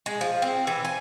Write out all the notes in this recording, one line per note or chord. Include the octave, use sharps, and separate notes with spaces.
G#3
F3
C4
E3
G#5